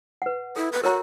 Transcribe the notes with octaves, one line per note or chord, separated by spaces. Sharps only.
B4 F#5
E4 A4
B4
F#4 A#4 C#5 A#5